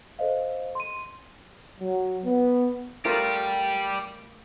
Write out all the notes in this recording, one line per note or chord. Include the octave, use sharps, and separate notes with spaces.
A4 C5 D#5 F5
C6 D#7
F#3
B3
G3 A3 F4 G4 A#4